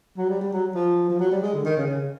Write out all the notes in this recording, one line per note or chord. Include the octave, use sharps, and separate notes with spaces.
F#3
G3
G3
F#3
F3
F3
F#3
G3
G#3
D3
D#3
C#3
C#3